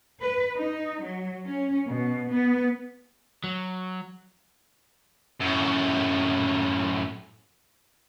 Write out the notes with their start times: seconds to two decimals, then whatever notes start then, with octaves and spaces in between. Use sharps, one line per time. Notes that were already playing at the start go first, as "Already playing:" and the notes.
0.21 B4
0.54 D#4
1.02 F#3
1.45 C#4
1.87 B2
2.30 B3
3.44 F#3
5.40 F#2 A2